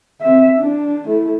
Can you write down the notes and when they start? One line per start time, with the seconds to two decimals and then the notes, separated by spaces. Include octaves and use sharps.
0.22 C4 E5
0.59 D4
1.05 A3 E4